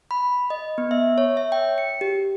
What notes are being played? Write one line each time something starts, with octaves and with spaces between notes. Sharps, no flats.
B5
D#5
B3
E5
C#5
E5
G5
C#7
G4